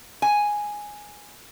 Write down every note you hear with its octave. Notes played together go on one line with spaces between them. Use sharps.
G#5